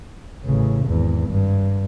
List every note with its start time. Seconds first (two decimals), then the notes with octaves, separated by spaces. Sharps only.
0.44 A1 C#3
0.85 G#1 E2
1.29 G2